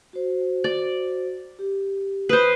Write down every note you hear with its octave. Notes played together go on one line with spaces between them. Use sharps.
F#4 C5
D5
G4
B4 C5 B5 D#6